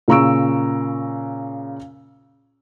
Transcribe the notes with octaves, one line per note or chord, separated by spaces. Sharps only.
A#2 C#3 A#5 C#6 E6 D7